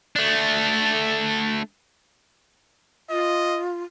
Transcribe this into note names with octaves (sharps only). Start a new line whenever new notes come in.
A3 D4
F4 D#5